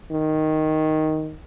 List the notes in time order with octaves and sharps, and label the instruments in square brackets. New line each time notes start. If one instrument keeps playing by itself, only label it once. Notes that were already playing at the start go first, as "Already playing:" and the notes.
[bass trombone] D#3